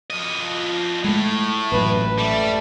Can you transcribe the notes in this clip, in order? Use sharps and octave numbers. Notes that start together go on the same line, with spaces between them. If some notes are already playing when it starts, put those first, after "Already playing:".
F3 D#5
A2 G#3 A3
A1 F#2 A#2 B4
G3 A3